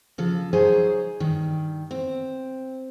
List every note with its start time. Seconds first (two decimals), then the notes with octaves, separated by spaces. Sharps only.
0.18 C#3 F3 A4
0.53 F#3 D#4 G#4 C5 C#5 G#5
1.20 G2 D#3
1.91 C4